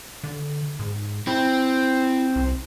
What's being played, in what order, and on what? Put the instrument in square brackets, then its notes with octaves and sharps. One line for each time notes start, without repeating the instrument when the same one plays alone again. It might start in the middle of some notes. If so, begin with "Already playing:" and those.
[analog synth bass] D3
G#2
[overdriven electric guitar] C4 [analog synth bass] E4
[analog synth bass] C2